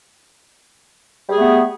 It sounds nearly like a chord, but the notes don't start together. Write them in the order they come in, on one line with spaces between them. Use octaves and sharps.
G3 G#4 A3 B3